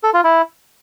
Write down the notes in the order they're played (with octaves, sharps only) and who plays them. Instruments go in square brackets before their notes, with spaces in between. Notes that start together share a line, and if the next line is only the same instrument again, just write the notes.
[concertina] A4
F4
E4